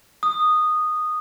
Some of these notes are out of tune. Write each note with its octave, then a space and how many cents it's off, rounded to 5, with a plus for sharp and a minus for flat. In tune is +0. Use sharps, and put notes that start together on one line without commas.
D#6 -10